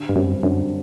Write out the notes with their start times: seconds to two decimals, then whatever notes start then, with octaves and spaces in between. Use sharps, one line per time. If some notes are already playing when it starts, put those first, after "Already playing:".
Already playing: D3
0.09 G2
0.16 F#2 G3 C4 G4
0.43 F#2 D3